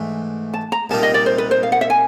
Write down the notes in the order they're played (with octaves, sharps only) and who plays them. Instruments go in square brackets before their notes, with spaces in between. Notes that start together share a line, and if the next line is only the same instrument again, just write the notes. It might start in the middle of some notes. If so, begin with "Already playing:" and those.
Already playing: [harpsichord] G#2 E3 A3 D4
[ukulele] A5
A#5
[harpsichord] C2 A#2 G3 A#3 D#4 [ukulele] A5
[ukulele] D#5
D5
C5
B4
C5
F5
F#5
E5
G#5